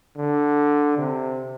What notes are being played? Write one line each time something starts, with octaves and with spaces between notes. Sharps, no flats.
D3
C3